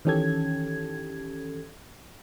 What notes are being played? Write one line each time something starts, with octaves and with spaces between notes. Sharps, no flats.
D#3 E3 C#4 G4 A4 G#6